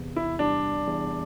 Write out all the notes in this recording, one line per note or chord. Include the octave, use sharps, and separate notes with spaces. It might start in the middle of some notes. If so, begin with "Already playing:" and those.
Already playing: E2 C3
E4
G3 D4
E2